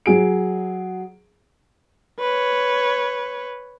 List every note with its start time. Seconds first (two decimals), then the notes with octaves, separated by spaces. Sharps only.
0.06 F#3 G#4 D7
2.19 B4 C#5